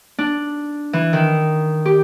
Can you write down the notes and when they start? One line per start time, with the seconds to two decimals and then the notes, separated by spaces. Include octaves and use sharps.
0.18 D4
0.93 E3
1.13 D#3
1.85 G4